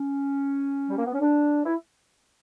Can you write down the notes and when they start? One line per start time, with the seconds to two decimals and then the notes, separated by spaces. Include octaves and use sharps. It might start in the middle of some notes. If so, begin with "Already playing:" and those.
Already playing: C#4
0.90 G3
0.98 A#3
1.05 B3
1.13 C#4
1.20 D4
1.65 E4